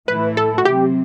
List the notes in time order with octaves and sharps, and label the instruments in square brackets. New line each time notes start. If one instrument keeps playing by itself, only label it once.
[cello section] A2 E3 A3 E4 [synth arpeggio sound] B4
[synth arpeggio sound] A4
F#4
[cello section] C3 F#3 C4 [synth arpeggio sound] G4